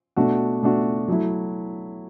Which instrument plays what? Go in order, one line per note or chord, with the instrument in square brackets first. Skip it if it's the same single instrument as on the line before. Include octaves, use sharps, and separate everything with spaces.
[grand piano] B2 A3 D4 F#4
B2 A3 D4 F#4
F#3 A3 E4